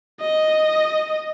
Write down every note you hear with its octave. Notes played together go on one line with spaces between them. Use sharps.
D#5